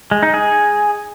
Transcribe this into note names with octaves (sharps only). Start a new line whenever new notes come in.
G#3
D#4
G#4